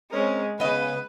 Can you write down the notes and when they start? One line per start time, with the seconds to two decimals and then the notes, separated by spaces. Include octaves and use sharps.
0.11 G#3 C4 C#4 A#4
0.60 C#3 B3 B4 D#5